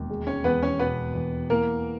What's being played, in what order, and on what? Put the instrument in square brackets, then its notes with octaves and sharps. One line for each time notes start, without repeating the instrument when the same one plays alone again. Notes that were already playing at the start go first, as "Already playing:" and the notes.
Already playing: [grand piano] E1 D#2
G#3
[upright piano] C#4 C#5
[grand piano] E2 [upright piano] B3 B4
[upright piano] C#4 C#5
[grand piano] B2 [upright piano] B3 B4
[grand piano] E2
[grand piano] E3 [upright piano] A#3 A#4